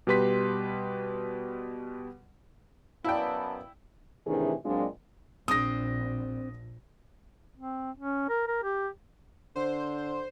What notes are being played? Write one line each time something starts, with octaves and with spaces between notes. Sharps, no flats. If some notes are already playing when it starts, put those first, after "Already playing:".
B2 G3 G4 B4 C6 B6
F#2 B3 E4 D5 F5 G5 A5
A2 C3 D#3 E3 D4 G#4
A#2 F#3 G#3 C4 D4 F4
A#1 C4 D4 D#6 A#6
C4
C#4
A#4
A#4
G4
D3 C5